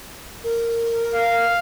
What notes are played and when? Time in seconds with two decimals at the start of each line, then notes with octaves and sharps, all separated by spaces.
0.44 A#4
1.15 F5